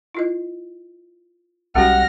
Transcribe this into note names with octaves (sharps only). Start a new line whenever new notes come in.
E4 F4 D#5
B1 G3 G#3 C#4 F#4 F#5 F6 A#6